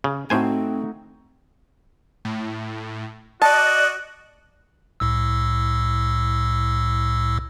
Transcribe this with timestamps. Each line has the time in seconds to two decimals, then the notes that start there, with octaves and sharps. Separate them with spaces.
0.04 C#3
0.30 A2 A3 C4 D#4 F#4 C5 G#5
2.25 A2
3.42 F#4 D5 D#5 A5
5.00 C2 A2 E6